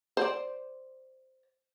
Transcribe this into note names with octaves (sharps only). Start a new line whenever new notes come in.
C5 D5